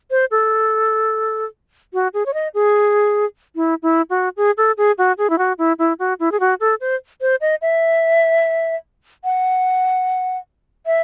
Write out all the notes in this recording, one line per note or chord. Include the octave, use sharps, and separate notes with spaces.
C5
A4
F#4
G#4
C#5
D#5
G#4
E4
E4
F#4
G#4
A4
G#4
F#4
G#4
E4
F#4
E4
E4
F#4
E4
G#4
F#4
A4
C5
C5
D#5
E5
F#5
E5